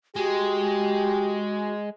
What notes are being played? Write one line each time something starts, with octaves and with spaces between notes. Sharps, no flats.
G#3 F#4 G4